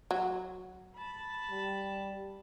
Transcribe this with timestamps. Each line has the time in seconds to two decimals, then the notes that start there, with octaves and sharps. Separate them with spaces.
0.11 F#3
0.96 A5 B5
1.51 G3